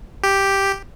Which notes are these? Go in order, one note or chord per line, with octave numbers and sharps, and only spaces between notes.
G4